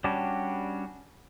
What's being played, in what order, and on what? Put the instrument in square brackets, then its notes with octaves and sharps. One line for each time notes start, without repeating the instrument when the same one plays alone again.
[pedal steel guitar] G3 C#4 D4 F#4 G4